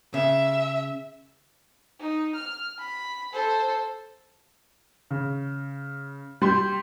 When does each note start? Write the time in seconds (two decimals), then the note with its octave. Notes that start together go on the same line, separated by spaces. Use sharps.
0.14 C#3 E5
2.00 D#4
2.35 F6
2.79 B5
3.33 A4 C5
5.11 C#3
6.42 G3 C6 G6